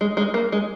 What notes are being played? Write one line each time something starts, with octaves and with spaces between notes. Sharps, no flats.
G#3
G#3
A#3
G#3